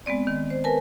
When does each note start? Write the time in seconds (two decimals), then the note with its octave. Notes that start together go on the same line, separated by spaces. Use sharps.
0.06 G#3 B3 C4 D5
0.27 D#3
0.50 C5
0.64 A#4 B4 G#5 A5